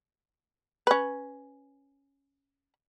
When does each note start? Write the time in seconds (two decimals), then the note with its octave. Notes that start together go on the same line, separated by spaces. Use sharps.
0.87 C#4 B4